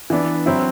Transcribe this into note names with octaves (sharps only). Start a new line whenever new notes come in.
E3 B3 D4
F#3 C4 E4